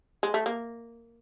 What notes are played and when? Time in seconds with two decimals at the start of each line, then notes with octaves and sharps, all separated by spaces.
0.23 G#3
0.34 A3
0.46 A#3